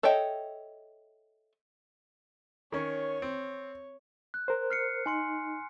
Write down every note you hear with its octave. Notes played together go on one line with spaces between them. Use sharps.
A4 C#5 D#5 E5 G5
D#3 C#4 C#5
C4
F#6
A#4 C5
F6 C7 C#7
D#4 G#5 C6 C#7